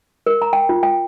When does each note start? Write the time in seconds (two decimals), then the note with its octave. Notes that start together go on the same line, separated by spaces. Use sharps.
0.26 A#4
0.42 A#5
0.53 G5
0.69 F4
0.83 G5